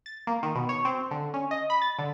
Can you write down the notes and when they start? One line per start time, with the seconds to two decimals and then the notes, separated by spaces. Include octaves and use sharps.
0.06 A6
0.27 A#3
0.43 D#3
0.55 B2
0.69 C#5
0.85 C4
1.11 D3
1.34 C#4
1.51 D#5
1.70 B5
1.82 A6
1.98 D3